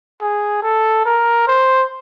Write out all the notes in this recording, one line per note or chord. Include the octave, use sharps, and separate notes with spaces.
G#4
A4
A#4
C5